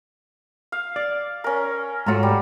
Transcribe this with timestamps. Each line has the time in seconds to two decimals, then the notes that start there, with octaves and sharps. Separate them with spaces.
0.72 F5
0.96 D5
1.44 C#4 A#4
2.06 G#2 F#3 A3 F4 A#5
2.23 G3